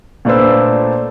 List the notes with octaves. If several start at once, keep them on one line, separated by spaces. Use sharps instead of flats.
A#2 A3 D4 B4 C5 E6